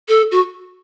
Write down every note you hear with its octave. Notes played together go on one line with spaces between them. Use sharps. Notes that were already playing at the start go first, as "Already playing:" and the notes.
A4
F#4